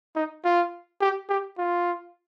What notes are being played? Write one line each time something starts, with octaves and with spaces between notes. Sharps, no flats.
D#4
F4
G4
G4
F4